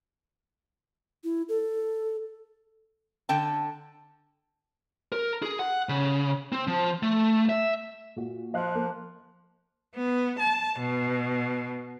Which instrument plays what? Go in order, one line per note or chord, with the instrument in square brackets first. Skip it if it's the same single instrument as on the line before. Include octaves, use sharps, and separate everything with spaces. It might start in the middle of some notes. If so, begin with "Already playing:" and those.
[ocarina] E4
A4
[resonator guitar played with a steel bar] D3 G5 A5
[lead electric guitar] A#4
G#4
F#5
C#3
C4
F3
A3
E5
[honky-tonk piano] A#2 F#4
[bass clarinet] F3 [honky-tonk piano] D#5 F5 F#6
[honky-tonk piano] A#3
[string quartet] B3
A5
B2